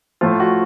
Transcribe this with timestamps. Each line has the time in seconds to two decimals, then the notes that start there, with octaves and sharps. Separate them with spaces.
0.21 A2 F3 F4
0.40 F#4